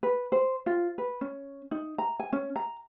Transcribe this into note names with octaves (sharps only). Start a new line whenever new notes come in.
B4
C5
F4
B4
C#4
D#4
A#5
G#5
C#4
A#5